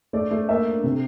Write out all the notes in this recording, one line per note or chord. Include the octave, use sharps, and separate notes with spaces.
A3 D5
A3
A#3 E5
D4
C3